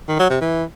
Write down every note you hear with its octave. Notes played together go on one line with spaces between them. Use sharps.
D#3
F#3
C3
E3